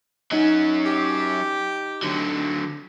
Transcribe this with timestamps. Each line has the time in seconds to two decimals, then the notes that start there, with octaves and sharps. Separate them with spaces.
0.31 F#3 C#4 D#4
0.85 G4
2.03 D3 F#3